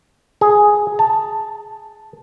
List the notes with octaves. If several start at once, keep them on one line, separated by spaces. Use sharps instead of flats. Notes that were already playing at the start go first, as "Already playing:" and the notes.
G#4
A5